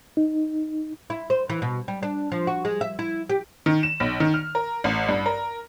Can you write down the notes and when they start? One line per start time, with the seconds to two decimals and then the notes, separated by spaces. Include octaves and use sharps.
0.17 D#4
1.10 E4
1.30 C5
1.49 E3
1.62 B2
1.88 G3
2.03 D4
2.32 F3
2.47 F#4
2.65 G#3
2.81 E5
2.99 E4
3.29 G4
3.66 D#3
3.83 E7
4.00 B1
4.20 D#3
4.34 F6
4.55 A#4
4.84 A1
5.08 G2
5.26 A#4